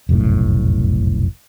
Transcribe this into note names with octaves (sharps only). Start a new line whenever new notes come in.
F1 B1 F#2 A2